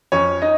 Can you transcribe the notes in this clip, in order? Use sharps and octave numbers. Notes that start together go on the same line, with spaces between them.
F2 C#4 C#5
D#4 D#5